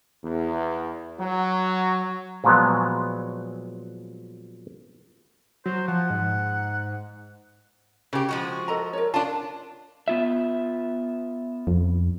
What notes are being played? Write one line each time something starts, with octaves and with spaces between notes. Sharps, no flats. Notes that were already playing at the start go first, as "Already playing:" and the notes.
E2
F#3
A#2 F3 F#3 G#3 B3
F#3 C5
F3 F#5
G#2
C#3 G4 C5
F3 G#3 F#4
A4 D#5 A#5
A#4 C#5
D4 F4 A5
B3 F4 E5
F2